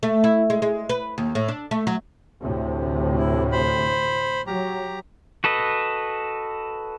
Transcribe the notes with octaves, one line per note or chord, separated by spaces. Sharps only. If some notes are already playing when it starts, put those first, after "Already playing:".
A3
E4
G#3
G#3
B4
D#2
A2
D4
A3
F#3
D2 A2 C3
E4
C5 B5
F#3 G4 A#5
F#4 A4 B4 D#5